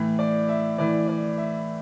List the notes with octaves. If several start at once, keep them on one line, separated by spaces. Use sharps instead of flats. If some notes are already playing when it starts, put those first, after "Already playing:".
Already playing: A2 E3
D5
E5
A2 E3 D5
D5
E5